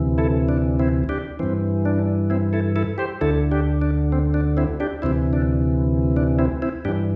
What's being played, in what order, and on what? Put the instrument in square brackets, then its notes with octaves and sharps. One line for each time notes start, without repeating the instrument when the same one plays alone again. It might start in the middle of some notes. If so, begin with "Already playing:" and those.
Already playing: [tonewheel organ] D2 C3 E3
E4 A4
D4
C4 E4
D4 G4
G2 E3 C4
D4
C4 E4
E4 A4
E4 A4
G4 C5
D2 D3 E4 A4
D4 G4
D4
C4
D4
C4 E4
D4 G4
D2 C3 E3 C4 E4
D4
D4
C4 E4
C4 E4
G2 D4 G4
E3